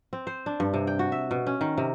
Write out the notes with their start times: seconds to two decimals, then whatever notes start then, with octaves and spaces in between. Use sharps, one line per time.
0.13 C4
0.27 C5
0.46 D4
0.60 G2
0.74 C3
0.87 G5
0.99 F#4
1.12 E5
1.31 B2
1.47 C#4
1.61 D#3
1.78 C3